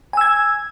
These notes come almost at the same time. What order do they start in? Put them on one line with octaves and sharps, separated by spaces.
G#5 E6 G#6